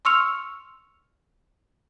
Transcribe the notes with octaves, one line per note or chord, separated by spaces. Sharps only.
C6 C#6 E6 F6 C#7 F7